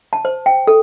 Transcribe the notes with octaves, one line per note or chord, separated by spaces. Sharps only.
A5
C5
G5
A4